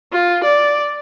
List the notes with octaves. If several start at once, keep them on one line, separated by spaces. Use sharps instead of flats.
F4
D5